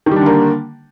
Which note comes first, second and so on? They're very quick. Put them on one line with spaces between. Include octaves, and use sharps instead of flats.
D#3 G3 D4 D3 A#3